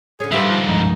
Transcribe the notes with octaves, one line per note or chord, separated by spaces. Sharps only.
D3 C#4 G#4
G#2 D3 G3 F4 B4 E5
F3
G2 F3 G#3 D#4